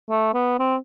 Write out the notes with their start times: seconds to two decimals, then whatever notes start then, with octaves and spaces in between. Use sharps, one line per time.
0.10 A3
0.34 B3
0.59 C4